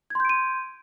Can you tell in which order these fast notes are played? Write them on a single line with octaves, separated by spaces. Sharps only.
G#6 C6 G6 D7 D#7